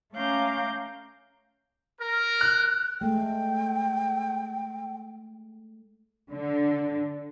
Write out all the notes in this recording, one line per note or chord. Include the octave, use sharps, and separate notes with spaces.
A3 C#4 F5 A#5 D6 G6
A#4
F#6
G#3 A3 G5
D3